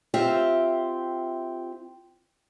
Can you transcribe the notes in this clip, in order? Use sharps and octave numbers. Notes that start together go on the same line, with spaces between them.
C4 F4 G4 E5